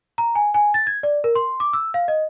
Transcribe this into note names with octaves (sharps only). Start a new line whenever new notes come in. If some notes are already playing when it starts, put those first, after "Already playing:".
A#5
G#5
G#5
A6
G#6
D5
A#4
C6
D6
E6
F5
D#5